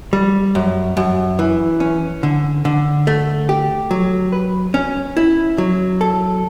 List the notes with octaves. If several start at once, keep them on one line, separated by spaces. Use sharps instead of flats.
G3
F#2
F#2
E3
C#4
D3
D3
A3
G4
F#3
B4
C#4
E4
F#3
A4